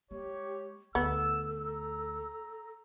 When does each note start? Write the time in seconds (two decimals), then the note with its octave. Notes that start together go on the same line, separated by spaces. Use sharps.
0.11 G#3 G4 C#5
0.95 D2 B3 A4 E6
1.61 A#5